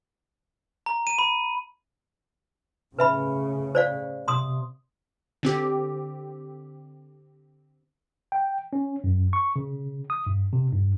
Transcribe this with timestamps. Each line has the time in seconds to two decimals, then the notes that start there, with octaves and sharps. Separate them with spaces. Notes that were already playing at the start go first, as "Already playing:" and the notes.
0.86 A#5
1.07 D#7
1.18 B5
2.99 A2 C#3 B4 E5 B5
3.75 C5 D5 F5
4.28 C3 C6 D#6
5.43 D3 C4 G4
8.32 G5
8.73 C#4
9.04 F#2
9.33 C#6
9.56 C#3
10.10 D#6
10.26 G2
10.53 C3
10.73 G2